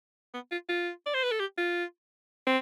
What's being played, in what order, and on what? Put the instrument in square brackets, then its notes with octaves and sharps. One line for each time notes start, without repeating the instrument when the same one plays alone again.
[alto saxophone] B3
F4
F4
D5
C5
B4
A4
G4
F4
C4